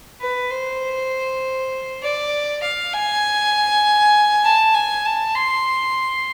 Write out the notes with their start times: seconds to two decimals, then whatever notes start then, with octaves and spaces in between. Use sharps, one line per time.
0.21 B4
0.51 C5
2.03 D5
2.63 F5
2.93 G#5
4.44 A5
4.74 G#5
5.05 A5
5.35 C6